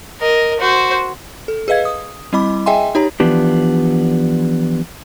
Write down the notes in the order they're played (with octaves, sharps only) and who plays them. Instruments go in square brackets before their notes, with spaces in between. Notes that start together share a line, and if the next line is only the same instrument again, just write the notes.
[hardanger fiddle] A#4 D#5
F#4 C5
[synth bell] A4
G#4 B4 D#5 F5 G#6
D#6
G3 C4 E4 D#5 B5 D6
G#4 D#5 E5 G5 G#5 C6
D#4 G4 C#5 A#5
[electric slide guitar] E3 F3 B3 D4 G4